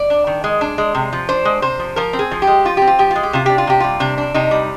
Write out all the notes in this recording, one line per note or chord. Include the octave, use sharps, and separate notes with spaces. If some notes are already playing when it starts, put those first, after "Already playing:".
Already playing: D5
D4
D#3
G#3
D4
G#3
C3
F3
D4 C5
G#3
C3 C5
F3
F3 A#4
C4
G#4
F3
G4
G#3
F3 F4
C4 G4
F4
F3 G4
G#3 F4
G4
C3 F4
D4 G4
F4
C3 G4
G3 F4
C3 D4
D4
C3 D#4
G3